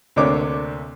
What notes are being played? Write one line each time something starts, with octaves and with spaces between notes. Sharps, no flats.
D2 C3 A#3 D4 C#5 D6